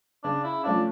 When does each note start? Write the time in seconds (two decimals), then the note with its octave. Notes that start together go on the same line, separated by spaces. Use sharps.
0.24 C#3 D4
0.44 E4
0.64 F3 A3 C#4 D4 F4